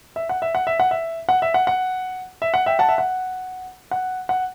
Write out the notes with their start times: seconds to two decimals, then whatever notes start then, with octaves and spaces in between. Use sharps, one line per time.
0.16 E5
0.29 F#5
0.42 E5
0.55 F#5
0.67 E5
0.80 F#5
0.91 E5
1.29 F#5
1.42 E5
1.54 F#5
1.67 F#5
2.42 E5
2.54 F#5
2.66 E5 G5
2.79 F#5 A5
2.89 E5
2.98 F#5
3.91 F#5
4.29 F#5